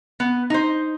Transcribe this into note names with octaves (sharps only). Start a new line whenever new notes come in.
B3
D#4 C5